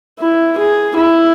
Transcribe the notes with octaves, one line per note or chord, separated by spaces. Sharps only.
E4
G#4
E4